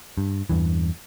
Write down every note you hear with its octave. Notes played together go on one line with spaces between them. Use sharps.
G2
E2 G2 E3